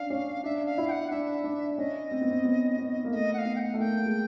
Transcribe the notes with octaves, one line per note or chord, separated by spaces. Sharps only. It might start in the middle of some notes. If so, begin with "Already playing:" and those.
Already playing: C#4 D4 F5
C#4
D4 E5
F5
E4
G5
F#5
D4 E5
D4
C#4 D#5
C4
B3
C4
B3
B3
A#3
A3 D#5 E5
F#5
F5
B3
G5
F#5
A3
A#3 G5
G#3